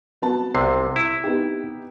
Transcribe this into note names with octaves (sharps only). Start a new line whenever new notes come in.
F#3 B3 A5
C2 C3 C7
E4
B3 D#4 G4